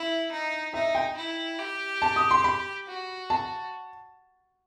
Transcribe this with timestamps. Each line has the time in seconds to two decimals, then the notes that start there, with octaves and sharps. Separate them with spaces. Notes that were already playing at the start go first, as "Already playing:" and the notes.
Already playing: E4 E5
0.32 D#4
0.74 D#4 E5
0.95 G5
1.17 E4
1.59 G4
2.02 A5
2.16 D#6
2.31 C6
2.44 B5
2.87 F#4
3.30 A5